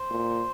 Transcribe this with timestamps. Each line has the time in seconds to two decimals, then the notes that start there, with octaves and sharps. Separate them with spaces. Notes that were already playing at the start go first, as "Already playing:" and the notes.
Already playing: C5
0.10 A#2